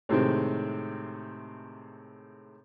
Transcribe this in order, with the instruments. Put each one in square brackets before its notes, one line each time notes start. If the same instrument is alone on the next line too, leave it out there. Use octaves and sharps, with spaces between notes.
[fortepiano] A2 C3 D#3 G#3 C4